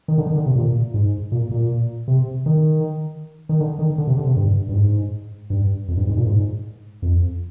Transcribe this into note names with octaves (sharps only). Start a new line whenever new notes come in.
D#3
D3
D#3
D3
C3
A#2
G#2
A#2
A#2
C3
D#3
D#3
D3
D#3
D3
C3
D3
C3
G2
G2
G#2
G2
F2
G2
G#2
A#2
G#2
F2